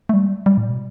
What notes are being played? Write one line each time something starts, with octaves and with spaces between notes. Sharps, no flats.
A3
G3
G3
A2
B2